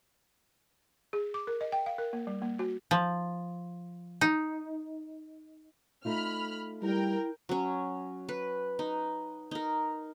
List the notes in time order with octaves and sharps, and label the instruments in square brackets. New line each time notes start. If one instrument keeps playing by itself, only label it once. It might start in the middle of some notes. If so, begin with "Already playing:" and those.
[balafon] G#4
D6
A#4
D#5
G5
F5
A#4
A#3
G3
A#3
F#4
[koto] F3
D#4
[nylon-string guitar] A3 D#4 F4 [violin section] B5 F6
[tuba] G3 [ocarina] E4 [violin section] A#4 G5
[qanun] F#3 C#4
B4
D#4
D#4 A#4